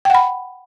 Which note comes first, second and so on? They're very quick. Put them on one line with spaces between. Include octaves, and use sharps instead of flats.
G5 F#5 B5